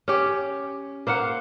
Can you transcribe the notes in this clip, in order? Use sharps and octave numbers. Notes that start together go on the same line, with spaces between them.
C#4 G4
A#3 C5 F5 F#5